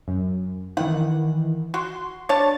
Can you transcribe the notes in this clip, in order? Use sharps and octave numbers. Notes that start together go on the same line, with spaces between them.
F#2
D#3 E3 F#5
F#4 C6
D4 C#5 A5 A6